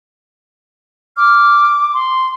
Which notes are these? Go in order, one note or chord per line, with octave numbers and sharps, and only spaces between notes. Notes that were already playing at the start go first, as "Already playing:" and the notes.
D6 F6
C6